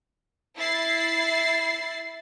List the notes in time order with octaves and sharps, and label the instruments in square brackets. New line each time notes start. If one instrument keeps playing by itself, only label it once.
[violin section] E4 A6 C7